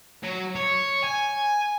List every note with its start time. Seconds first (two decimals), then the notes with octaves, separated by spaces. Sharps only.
0.23 F#3
0.56 C#5
1.04 G#5